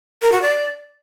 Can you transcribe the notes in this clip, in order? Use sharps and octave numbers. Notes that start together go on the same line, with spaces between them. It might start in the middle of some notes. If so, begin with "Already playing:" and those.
A#4
F#4
D5